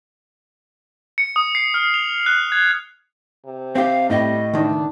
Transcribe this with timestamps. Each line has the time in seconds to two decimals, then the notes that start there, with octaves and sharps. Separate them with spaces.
1.18 C#7
1.36 D#6
1.55 C7
1.74 F6
1.94 F7
2.26 F#6
2.52 G#6
3.46 C3
3.75 C4 G4 F5
4.10 A2 G3 D#5
4.54 C#2 D#3 D4